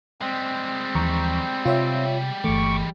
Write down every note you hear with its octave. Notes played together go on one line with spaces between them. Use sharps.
G3 G#3 C4
D#2 E3 F3 A#5 C#6
C3 F4 C#5 E5
G1 E3 A3 C#6 D6